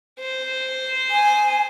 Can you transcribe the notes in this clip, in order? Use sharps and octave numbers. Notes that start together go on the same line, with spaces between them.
C5
G#5